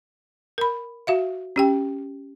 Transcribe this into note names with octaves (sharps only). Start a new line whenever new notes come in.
A#4 B5
F#4 E5 F5
C#4 G4 G5